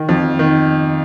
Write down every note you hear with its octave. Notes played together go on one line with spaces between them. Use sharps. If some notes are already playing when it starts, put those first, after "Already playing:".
Already playing: D#3
F2
D#3